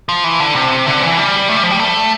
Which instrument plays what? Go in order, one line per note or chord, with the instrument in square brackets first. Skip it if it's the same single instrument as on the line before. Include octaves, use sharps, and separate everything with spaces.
[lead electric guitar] F3
E3
D3
C3
D3
E3
G3
A3
G3
F3
G3
A3